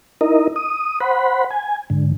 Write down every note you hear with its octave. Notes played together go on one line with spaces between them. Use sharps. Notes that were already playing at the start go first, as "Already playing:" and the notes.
D#4 E4 A#4 D#5
D#6
C5 F#5 B5
G#5
G#2 D3